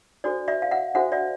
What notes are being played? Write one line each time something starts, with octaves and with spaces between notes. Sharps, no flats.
D4 F#4 A4 C5 D5
D5 E5
F5
E5 F#5
D4 F#4 A4 C5 E5 F#5
D5 E5